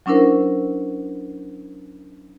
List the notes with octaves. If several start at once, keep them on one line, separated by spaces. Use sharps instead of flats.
F#3 C#4 D4 E4 A#4 C5